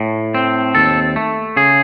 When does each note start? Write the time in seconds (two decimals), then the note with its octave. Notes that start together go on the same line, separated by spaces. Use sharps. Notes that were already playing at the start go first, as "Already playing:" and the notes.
Already playing: A2
0.34 C4
0.75 D#2 A4
1.16 A3
1.57 C#3 G#4